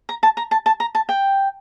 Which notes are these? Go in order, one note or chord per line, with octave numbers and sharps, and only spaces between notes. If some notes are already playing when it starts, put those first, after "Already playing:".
A#5
A5
A#5
A5
A5
A#5
A5
G5